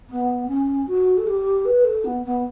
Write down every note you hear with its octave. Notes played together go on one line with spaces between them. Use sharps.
B3
C#4
F#4
A4
G4
B4
A4
B3
B3